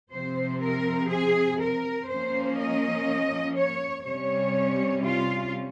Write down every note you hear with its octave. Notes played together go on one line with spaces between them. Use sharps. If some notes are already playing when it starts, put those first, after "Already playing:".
C3 F3 C4 C5
A#4
G#4
A#4
F3 A#3 C#4 C5
D#5
C#5
C3 G3 C#4 C#5
F4